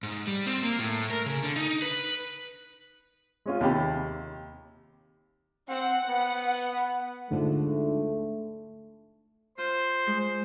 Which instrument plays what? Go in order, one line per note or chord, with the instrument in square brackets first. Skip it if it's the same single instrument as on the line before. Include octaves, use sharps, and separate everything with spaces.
[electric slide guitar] G#2
G3
C4
A#3
A2
A#4
C#3
D3
D#4
B4
[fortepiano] G#3 C#4 F4
D#2 C3 G4 B5
[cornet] C4 [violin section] F#5
[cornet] B3
[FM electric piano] D2 G#2 F3 [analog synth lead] D3 [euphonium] A3
[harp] F4 [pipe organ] C5
[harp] G#3